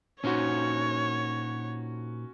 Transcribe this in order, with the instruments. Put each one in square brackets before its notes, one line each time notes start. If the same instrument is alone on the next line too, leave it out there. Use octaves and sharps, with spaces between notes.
[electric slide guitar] A#2 D#4 C5 [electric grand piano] C#4 F#4 [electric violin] C#5